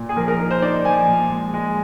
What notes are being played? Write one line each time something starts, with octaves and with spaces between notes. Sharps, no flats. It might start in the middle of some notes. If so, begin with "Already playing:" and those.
Already playing: A#2
G#4
F3 A#4
A#4
D#4
C5
D#4 D5
F3 G#5
A#2
G#3
G#3